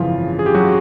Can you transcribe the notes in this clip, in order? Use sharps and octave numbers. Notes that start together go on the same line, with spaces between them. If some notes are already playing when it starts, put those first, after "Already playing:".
Already playing: G#1 F#2 C#3 E3 F3 F4
G#4
G4
F#3 F#4